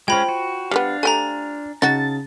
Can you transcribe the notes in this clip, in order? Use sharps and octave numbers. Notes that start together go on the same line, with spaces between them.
G#3 C#4 F4 C5 G5 B5 F7
F#4
G3 G#3 B3 D4 F5
A3 G4 G#5 A#5
C#3 D#4 F#4 A5 A6